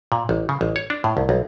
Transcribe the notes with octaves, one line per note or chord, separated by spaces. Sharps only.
A#2
A1
C#3
A1
C#5
D4
A2
C2
B1